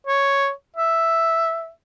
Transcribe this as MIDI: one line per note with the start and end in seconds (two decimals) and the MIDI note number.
0.07 0.51 73
0.77 1.70 76